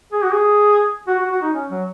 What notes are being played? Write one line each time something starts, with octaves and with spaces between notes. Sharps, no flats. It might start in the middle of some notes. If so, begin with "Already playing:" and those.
G#4
F#4
G#4
F#4
F#4
F#4
D#4
C#4
F#3